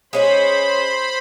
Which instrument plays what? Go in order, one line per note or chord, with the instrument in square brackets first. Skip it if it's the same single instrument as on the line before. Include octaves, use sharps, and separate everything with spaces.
[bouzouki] G#3 C#4 G#4 [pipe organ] C5 B5